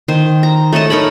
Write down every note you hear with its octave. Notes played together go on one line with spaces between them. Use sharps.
D#3 C5
A#5
A3 C#5 D#5 A5
D#4 A#4 C#5 B5